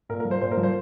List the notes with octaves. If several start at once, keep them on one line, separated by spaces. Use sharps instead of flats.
A#2 A#4
A#4
F3
C5
A#2 C5
A#4
F3
C5